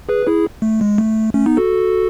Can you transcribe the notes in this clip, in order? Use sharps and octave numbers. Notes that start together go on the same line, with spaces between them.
G#4 B4
E4 G#4
A3
G#3
A3
A3 C#4
B3 D#4
F#4 A4